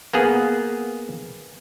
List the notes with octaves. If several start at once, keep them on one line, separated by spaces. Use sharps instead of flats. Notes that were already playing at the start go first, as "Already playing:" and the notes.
A#3 B3 G#4